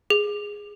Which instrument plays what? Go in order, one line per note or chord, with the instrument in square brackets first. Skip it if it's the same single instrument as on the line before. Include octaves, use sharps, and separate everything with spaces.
[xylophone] G#4